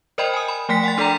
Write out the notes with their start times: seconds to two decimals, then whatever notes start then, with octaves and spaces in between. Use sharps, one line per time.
0.18 A#4 C5 D5 D#5 G5 B5
0.34 G#5 D#6
0.48 B5
0.69 F3 A3 G5 G#5 B6
0.84 F#5 C6 A6
0.98 D4 A4 D5 G5 A#5